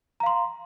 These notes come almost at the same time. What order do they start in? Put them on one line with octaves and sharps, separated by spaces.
A#5 F5 C6